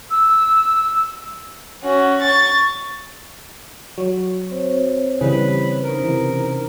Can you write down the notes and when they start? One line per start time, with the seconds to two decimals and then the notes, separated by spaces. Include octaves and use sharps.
0.10 E6
1.83 C#4 F#4
2.22 C#6 A6
3.98 F#3 C#6
4.50 C4 C5 C#5
5.21 C#3 E3 G3 B4
5.85 C#4 D#4 A#4 C5
6.02 C3 E3